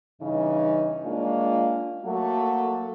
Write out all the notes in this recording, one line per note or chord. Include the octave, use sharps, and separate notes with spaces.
G2 C#3 E3 D#4
G#3 A#3 C#4 D4 F4
F#3 A3 A#3 F#4 A4